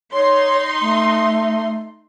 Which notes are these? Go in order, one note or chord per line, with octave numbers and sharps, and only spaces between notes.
D#4 C#5 C6
A3